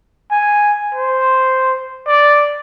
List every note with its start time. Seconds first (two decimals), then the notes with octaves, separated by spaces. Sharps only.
0.31 G#5
0.95 C5
2.07 D5